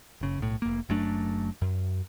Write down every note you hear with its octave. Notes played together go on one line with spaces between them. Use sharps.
F#1 C#3
B1 A2
F1 A#3
F#1 F#2 A3 D4
F#2